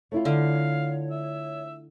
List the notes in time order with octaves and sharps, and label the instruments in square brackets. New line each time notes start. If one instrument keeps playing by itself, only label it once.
[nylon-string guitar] A3 E4 F4 [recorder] C#5
[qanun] D3 [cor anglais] F5
[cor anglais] E5